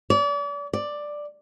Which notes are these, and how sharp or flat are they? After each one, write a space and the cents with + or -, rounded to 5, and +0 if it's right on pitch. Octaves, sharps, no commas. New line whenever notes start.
D5 -40
D5 +5